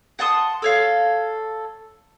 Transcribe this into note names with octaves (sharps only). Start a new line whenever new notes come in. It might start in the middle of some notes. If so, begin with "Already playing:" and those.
F#5 A5 C6 D#6
A4 C#5 F5